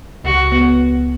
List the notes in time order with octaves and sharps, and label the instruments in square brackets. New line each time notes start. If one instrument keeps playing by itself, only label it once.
[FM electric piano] C#2 [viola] F#4
[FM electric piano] B3